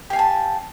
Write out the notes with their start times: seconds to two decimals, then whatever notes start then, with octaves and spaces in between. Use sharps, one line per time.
0.10 G4
0.13 F5
0.16 G#5
0.19 A5